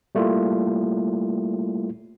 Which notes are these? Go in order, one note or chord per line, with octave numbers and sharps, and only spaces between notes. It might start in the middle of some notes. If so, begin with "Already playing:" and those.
G3 A3 A#3 E4 F4